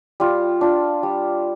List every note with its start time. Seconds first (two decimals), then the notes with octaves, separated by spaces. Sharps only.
0.20 G3 F4
0.61 D4 F4
1.03 G3